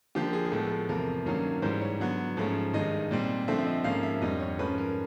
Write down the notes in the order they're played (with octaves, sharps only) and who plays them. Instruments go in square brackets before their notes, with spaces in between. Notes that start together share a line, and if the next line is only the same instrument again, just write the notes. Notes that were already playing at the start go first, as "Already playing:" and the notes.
[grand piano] D3 F3 A#3 G4
G#4
G#4
A2 F3 G#3 B3 A4
A4
E2 C3 F3 A3 A#4
G2 D#3 F#3 A#3 C#4
G#2 E3 G3 C5
C#5
D3 F#3 B3
G#2 F3 A3 C#4
G2 D#3 G#3 D#5
A#2 G3 C4
D3 F3 A3 C4 E5
E5
D#5
G#2 F3 A#3 C#4 F5
E5
F2 D3 G3 D#5
C#5
G#2 F3 A3 C#4 B4
A#4